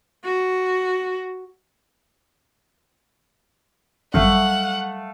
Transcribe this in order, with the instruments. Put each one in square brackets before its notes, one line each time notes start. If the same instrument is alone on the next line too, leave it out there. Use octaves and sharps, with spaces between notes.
[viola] F#4
[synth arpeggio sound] G#1 F#2 [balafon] F#3 G3 [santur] A3 F5 [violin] F#5